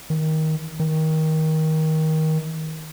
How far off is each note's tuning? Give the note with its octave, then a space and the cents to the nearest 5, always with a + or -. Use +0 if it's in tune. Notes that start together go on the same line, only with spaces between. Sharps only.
D#3 +15
D#3 +20